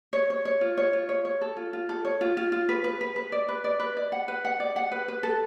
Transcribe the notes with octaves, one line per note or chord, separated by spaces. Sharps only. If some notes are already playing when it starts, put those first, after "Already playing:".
C#5
C#5
C#5
F4
C#5
F4
C#5
C#5
A4
F4
F4
A4
C#5
F4
F4
F4
B4
B4
B4
B4
D5
B4
D5
B4
D5
F#5
B4
F#5
D5
F#5
B4
B4
A4